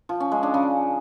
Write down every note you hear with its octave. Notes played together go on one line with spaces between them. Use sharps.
F3
C#4
G#3
D4
C#3